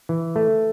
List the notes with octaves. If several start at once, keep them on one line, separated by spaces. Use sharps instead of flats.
E3
A3